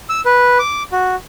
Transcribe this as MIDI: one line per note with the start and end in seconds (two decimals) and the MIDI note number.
0.09 0.21 88
0.25 0.58 71
0.59 0.83 86
0.92 1.15 66